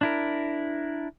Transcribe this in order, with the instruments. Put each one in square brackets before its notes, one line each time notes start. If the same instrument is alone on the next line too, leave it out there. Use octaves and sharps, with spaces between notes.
[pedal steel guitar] D4 E4 A#4